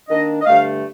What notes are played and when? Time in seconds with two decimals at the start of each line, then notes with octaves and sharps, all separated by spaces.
0.09 D#3 A#3 D4 D#5
0.41 D#5
0.46 G2 D3 A3 F5